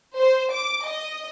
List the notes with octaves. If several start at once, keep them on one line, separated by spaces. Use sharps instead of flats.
C5
D6
D#5